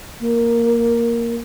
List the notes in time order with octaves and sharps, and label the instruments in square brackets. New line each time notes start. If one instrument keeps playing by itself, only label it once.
[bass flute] A#3